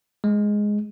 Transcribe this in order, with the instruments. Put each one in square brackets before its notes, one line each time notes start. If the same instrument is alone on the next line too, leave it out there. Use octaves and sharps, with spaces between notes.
[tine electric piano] G#3